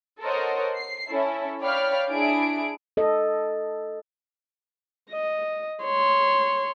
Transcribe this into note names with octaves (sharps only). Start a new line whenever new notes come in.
A4 A#4 C5 C#5 D#5 F#5
C7
C#4 E4 A4
C#5 D5 F5 G5 B5 F6
D4 E4 G#4 D7
A4 D#5
D#5
C#5 C6